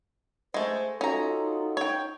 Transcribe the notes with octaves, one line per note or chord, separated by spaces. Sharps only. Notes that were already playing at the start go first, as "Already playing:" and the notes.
G#3 A3 C5
C#4 D#4 F4 F#4 A4 A#5
C#5 G5